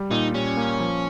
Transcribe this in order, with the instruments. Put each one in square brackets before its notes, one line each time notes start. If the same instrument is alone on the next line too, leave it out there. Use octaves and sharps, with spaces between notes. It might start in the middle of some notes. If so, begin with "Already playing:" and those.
Already playing: [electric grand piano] G3
[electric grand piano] A#2 [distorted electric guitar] D#4
[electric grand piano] G3 [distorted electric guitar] C#4
[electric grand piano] A#3
F3